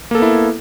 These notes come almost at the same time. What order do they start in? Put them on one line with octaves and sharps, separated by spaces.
A#3 A4 B3 E4